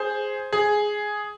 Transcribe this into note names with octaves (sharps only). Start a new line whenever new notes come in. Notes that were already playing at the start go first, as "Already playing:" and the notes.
Already playing: G#4 C5
G#4